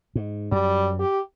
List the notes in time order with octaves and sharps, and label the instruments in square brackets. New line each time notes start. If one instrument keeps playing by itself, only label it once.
[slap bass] G#2
[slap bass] F#2 [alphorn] G3
[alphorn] G4